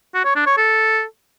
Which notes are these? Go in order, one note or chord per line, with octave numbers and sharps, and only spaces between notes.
F#4
C#5
D4
C#5
A4